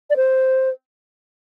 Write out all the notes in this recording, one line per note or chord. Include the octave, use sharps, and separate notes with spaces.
D5
C5